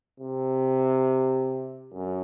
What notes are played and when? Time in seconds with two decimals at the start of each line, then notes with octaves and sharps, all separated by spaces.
0.20 C3
1.94 F#2